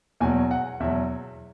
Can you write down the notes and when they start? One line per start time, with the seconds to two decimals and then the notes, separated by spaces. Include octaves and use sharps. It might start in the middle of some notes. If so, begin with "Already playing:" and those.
0.20 E2 B2 F#3 G#5
0.51 F#5
0.80 E2 B2 F#3 E5